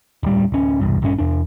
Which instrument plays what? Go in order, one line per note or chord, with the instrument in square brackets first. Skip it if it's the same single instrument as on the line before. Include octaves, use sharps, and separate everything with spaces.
[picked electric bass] D1 G3
D1 C#4
E1 C2 G2
A#1 G2 C#4
E2 D4